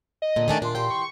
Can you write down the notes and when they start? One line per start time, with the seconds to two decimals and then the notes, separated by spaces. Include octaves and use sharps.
0.22 D#5
0.36 A#2 D3
0.48 D#3 A3 D4 D5 G#5
0.62 A#2 D4 C6
0.75 E3 G4 G5
0.90 C#6